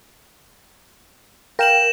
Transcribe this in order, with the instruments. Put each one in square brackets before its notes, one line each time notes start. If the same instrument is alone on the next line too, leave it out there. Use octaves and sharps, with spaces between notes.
[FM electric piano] A#4 F5 G5 [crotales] A#6 E7 F#7